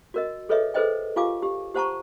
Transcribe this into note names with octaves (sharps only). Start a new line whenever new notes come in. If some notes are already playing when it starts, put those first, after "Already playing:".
F#4 A#4 D#5
G#4 A4 B4 C#5 D#5 E5
G#4 A4 B4 C5 D#5 G5
F4 G4 F5 G#5 D6
G4
G4 C5 F#5 A5 A#5 C#6